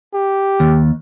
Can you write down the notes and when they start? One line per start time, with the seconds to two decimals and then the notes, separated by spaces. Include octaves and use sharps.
0.14 G4
0.60 D#2